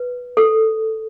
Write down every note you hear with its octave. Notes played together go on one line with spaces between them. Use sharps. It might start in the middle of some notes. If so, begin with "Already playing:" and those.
Already playing: B4
A4